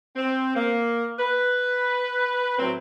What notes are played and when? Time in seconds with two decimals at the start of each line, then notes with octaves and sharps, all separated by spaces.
0.16 C4
0.55 A#3
1.19 B4
2.59 A2 F#3 C4